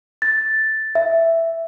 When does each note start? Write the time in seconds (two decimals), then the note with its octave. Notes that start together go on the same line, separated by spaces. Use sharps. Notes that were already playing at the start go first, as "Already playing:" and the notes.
0.22 A6
0.95 E5